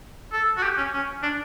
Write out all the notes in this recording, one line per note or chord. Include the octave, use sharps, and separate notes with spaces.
A4
F#4
G4
C#4
C#4
D4